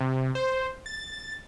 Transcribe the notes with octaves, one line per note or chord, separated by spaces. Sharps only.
C3
C5
A6